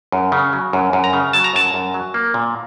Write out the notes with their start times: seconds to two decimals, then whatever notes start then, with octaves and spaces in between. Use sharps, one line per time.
0.12 F#2
0.32 C#3
0.53 F#3
0.73 F#2
0.93 F#2
1.04 A#5
1.13 C#3
1.33 F#3 A5
1.44 A#5
1.53 F#2 A5
1.74 F#2
1.94 F#3
2.14 A#3
2.34 A#2